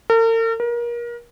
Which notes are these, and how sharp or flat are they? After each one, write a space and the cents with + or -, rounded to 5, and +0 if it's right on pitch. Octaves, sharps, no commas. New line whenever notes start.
A#4 -45
A#4 +30